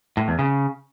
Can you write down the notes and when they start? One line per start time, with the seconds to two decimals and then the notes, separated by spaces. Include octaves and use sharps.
0.17 A2
0.28 E2
0.39 C#3